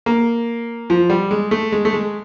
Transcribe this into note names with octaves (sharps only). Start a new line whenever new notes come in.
A#3
F3
G3
G#3
A3
G#3
A3
G#3